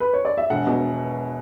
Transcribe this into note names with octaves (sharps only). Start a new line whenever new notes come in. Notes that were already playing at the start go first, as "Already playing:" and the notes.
B4
C#5
D5
E5
E1 F#5
B2